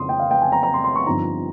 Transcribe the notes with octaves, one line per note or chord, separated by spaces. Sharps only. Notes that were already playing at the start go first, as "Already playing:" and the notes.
Already playing: F2 C#3 C6 D#6
G5
F5
G5
G#5
A#5
A#5
C6
C6
C#6
G1 G2 F3 C4 D#4 A#5